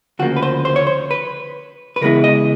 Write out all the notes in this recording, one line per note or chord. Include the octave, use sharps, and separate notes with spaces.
D2 C#3 F3 A#3 F#4
B4
C5
C5
C#5
C5
B4
B4
C#3 E3 G#3 B3 E4 A#4
D#5